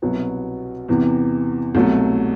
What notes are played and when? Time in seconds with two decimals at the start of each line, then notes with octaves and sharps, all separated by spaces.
0.02 C2 B2 F#3 B3
0.89 E2 C3 E3
1.75 C2 B2 F#3 A3